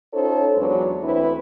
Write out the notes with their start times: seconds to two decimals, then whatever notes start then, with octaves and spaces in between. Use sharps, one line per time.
0.14 C#4 D#4 F4 A4 C5 C#5
0.57 E2 F#3 G#3 D4 B4 C#5
1.04 D2 E3 C4 E4 B4